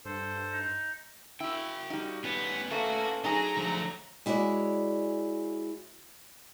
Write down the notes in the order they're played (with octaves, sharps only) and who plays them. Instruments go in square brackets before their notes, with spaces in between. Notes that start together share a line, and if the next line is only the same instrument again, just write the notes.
[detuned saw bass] G2 [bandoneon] A4 C5
[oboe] D#4
[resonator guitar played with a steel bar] E4 [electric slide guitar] F#4 G5
[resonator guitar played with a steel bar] G3 D#4
[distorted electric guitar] B3 [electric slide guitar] C#4 B4 C#5
[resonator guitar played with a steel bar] A3 [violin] A#3 [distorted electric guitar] F#4
[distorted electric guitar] F#3 [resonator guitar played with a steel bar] D#4 G#4 [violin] A#5
[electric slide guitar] D3 F3 A3
[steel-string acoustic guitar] G#3 E4 F#4 C#5 D5